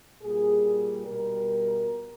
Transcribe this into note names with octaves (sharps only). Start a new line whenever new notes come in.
A#2 G3 G#4
B2 G3 A#4